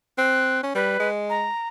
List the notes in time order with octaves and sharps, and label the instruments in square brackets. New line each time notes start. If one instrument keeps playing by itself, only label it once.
[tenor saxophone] C4 [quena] F#6
[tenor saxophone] C#4
[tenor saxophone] G3 [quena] B4
[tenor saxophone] G#3
[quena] A#5